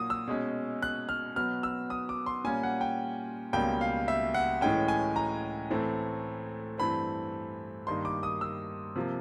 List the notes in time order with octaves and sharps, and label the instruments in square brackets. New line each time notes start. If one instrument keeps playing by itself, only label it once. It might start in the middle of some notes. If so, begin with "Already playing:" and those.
Already playing: [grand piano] A#2 F#3 A#3 D#6
E6
B2 G#3 C#4
F#6
F6
B2 F#3 B3 F6
E6
D#6
D6
C6
A#2 G3 A#3 C#4 G#5
F#5
G5
C#2 B2 G3 A#3 C#4 G5
F5
E5
F#5
A2 E3 G#3 C#4 G5
G#5
A#5
A2 E3 A3 C4
G2 E3 A3 C4 B5
G2 D#3 G3 A#3 C6
D6
D#6
E6
C3 F3 A#3